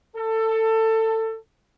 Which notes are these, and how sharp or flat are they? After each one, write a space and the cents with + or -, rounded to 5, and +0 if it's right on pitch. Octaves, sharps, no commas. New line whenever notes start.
A4 +20